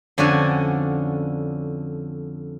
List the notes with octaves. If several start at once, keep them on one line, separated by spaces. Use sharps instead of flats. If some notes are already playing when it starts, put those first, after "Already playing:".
F2 D3 C#4 F#4 D5 G#5